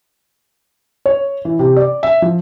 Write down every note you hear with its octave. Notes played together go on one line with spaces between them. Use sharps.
C#5
E3
C3
D5
E5
F3